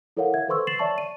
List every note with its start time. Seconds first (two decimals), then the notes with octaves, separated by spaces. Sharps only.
0.17 E4 A4 A#4 C#5 F5 F#5
0.34 E5 G#6
0.48 A4 B4 C5 C6 C#6 E6
0.67 A6 C7 E7 F#7
0.79 C#5 D5 E5 A5 C#6
0.98 D#7